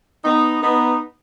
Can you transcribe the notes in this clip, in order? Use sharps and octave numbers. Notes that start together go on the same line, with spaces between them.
B3 D#4
B3 D#4